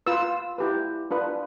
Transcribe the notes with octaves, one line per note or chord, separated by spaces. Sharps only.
F4 B4 E6
E4 G4 B4
D4 F4 B4